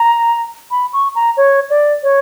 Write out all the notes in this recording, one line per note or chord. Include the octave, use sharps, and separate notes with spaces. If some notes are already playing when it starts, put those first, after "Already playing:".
Already playing: A#5
B5
C#6
A#5
C#5
D5
C#5